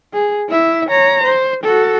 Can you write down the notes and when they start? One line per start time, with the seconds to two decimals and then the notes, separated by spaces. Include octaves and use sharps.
0.13 G#4
0.48 E4 E5
0.89 C#5 A#5
1.23 C5
1.64 F#4 A4